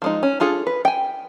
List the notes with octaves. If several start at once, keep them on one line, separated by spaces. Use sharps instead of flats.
F3 G#3 D#4
C#4
D4 F4 G#4 A4
B4
G5 G#5